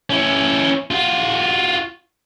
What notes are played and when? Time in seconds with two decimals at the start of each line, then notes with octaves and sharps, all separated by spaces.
0.10 C#4 E4
0.91 F4 F#4